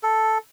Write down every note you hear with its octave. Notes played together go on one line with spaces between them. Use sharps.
A4